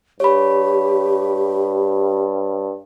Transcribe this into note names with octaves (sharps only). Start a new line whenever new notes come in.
G2 G4 C#5 B5